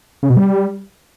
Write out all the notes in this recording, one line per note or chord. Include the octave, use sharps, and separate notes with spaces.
C#3
B2
G3